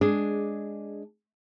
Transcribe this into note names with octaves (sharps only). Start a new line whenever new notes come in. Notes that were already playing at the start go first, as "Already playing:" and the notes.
G#3 D4 G#4